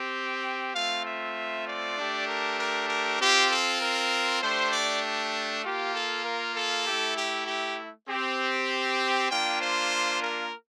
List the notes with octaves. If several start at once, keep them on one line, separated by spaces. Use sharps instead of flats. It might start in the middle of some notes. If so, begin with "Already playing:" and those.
Already playing: C4 G4
A3 C4 F4 F5
E5
D5
A3 D4 G4
A#4
A#4
A#4
C4 F4 G4
A4
A#4
A3 D4 G4 C5
D5
A#3 F4 G4
A4
A#4
A4
A3 E4 G4
G4
G4
C4 G4
A#3 D4 F4 G5
C5
A#4